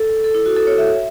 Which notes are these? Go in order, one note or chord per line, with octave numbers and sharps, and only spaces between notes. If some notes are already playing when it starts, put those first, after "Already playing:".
Already playing: A4
A4
E4
F#4
A4
C#5
E5